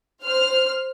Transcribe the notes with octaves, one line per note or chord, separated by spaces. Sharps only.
C5 F6